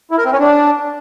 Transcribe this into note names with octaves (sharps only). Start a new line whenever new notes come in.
E4
A#4
C4
C#4
D4